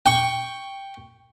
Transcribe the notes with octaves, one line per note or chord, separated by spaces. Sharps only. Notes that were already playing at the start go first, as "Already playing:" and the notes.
G5 C#6